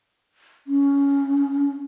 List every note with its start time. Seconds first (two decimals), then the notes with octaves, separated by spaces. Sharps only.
0.67 C#4